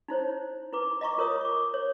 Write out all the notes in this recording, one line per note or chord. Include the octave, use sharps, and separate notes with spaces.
D#4 E4 C5 C#5
E4 B4 D6
D#5 F5 A#5 C#6 D6
F4 A#4 C#5 D#6
C#6 D6
C#5